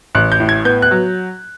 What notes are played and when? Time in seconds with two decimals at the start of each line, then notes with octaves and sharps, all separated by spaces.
0.15 A1 F#6
0.32 G6
0.40 A2
0.49 G#6
0.65 B3 G6
0.82 F#6
0.91 F#3